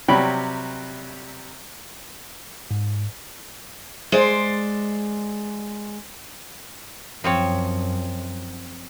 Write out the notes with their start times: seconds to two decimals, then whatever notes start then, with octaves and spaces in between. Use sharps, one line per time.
0.08 C3 F#3 G3 C#5 G5 B5
2.71 G#2
4.12 G#3 C5 D5
7.24 F#2 F3 C4 C#5